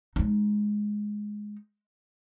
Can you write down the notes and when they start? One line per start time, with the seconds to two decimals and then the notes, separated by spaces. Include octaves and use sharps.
0.16 G#3 D#4